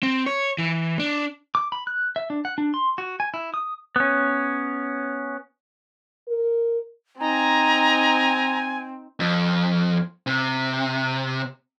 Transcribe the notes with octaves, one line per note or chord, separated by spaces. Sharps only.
C4
C#5
E3
D4
D6
B5
F#6
E5
D4
F#5
D4
C6
F#4
G#5
E4
D#6
B3 C#4
A#4
C4 D#4 G#5 A#5
F2
C3